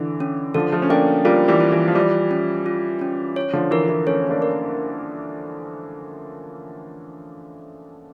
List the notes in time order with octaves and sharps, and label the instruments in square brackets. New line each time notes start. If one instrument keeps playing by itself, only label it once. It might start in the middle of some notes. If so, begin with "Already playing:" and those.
Already playing: [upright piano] D3 E3
[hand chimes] C#4
[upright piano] D3 F3 [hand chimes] A4
[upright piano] F3 A3
C#4
[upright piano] A#3 D4 [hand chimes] G5
[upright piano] G3 A#3 [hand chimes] F4
[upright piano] E3 G3
[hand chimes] F4
[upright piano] E3
F3
[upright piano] E3 G3 [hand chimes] F4
[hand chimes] C#4
F4
C#4
C#5
[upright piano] D3 F3
[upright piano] E3 [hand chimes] A#4
[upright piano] E3
[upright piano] A3 C#4 [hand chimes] C#5
[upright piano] A#3 D4
[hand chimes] A#4